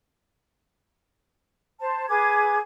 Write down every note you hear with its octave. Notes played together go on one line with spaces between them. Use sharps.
C5 A5
G#4 B4 D6 G#6